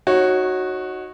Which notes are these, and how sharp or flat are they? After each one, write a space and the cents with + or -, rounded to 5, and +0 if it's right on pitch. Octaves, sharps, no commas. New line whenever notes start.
D#4 +0 F#4 +0 C#5 -20